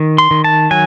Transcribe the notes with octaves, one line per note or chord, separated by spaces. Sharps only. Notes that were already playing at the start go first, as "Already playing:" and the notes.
Already playing: D#3
C6
D#3
A5
F#3 G#5